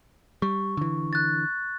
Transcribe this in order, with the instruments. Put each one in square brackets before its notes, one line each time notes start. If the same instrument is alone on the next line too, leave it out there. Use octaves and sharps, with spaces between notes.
[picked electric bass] G3 [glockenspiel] C#6
[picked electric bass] D3 E3
[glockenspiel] F#6 A6